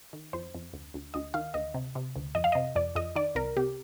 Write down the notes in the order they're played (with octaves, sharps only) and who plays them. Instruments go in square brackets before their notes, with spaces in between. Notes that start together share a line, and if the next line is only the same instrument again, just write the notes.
[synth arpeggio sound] D#3
F2 C5
F2
D2
D2
D2 D#5
D#3 F5
D2 D#5
C3
C3
D2
F2 D#5
F5
C3 D#5
F2 D5
F2 D#5
D#3 D5
C2 A#4
C3 G4